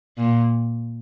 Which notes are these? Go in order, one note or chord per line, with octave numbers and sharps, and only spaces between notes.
A#2